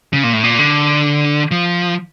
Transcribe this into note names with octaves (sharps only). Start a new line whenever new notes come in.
C#3
A#2
A2
A#2
D3
F3